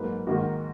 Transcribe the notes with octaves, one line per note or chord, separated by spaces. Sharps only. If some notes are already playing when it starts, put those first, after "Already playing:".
Already playing: G#2 F#3 A#3 B4
G#2 D#3 A#3 F#4